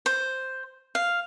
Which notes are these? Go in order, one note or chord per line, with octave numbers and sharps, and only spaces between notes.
C5
F5